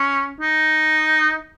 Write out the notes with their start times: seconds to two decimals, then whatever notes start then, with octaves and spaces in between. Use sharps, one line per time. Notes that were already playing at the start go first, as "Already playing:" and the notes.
Already playing: C#4
0.41 D#4